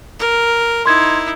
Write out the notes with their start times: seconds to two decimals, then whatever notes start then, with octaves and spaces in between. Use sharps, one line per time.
0.20 A#4
0.86 D#4 E4 C6 G#6